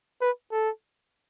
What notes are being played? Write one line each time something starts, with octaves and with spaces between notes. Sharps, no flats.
B4
A4